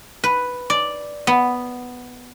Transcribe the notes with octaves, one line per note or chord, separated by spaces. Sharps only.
B4
D5
B3